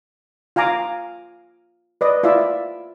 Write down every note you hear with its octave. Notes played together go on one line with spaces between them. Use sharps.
F4 F5 G#5 A#5 D6
B4 D5 D#5
E4 F4 D5 E5